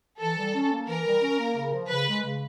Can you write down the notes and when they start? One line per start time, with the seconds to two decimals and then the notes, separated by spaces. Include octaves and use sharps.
0.20 E3 A4
0.38 G3
0.55 C#4
0.72 A#3
0.89 E3 A#4
1.06 G3
1.22 C#4
1.39 A#3
1.57 C#3
1.73 F3
1.90 C#3 B4
2.07 G#3
2.23 C#3